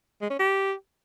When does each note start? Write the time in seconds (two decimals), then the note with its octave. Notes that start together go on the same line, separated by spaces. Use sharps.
0.21 G#3
0.30 C#4
0.39 G4